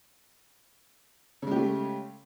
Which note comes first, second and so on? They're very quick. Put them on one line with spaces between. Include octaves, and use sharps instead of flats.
C#3 G#3 G4 A3